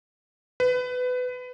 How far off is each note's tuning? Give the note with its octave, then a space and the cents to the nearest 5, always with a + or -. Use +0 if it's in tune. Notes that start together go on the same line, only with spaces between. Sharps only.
B4 +20